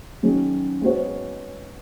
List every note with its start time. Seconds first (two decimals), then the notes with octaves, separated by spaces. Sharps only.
0.23 D#3 F#3 C#4 G#4
0.81 G#3 B3 F#4 C#5